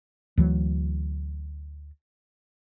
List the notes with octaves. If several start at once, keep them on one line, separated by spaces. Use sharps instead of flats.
D2 E3 F#3